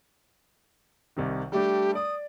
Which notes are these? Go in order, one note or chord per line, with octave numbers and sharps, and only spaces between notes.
C2 C3 D#3
G3 A3 D4 G4
D5 D#6